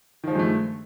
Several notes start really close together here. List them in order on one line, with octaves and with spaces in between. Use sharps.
D#3 F3 G#3 G2 A3